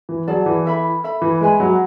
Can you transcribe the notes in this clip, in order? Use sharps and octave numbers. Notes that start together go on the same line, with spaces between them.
E3
F#3 G#4 D5 A5
E3
A4 E5 B5
A4 E5 B5
E3
G#3 B4 E5 G#5 B5
F#3